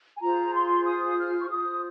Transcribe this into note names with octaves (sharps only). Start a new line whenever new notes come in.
G#5
F4 G#4 C5 A#5
C6
D#6
F6
C#6
F4 C5 D#6